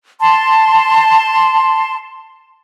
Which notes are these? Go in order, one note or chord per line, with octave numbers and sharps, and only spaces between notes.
A5 C6